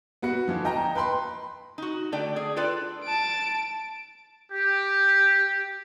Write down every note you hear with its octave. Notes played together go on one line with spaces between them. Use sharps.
B3 F#4 B4 C#7
D3 E3 F3
D#5 G5 A5 A#5
B4 G5 B5 C6
D#4 F#4
D3 A3 D5 G5
G#4
D4 F4 A4 B4 D5 G5
A5 D7
G4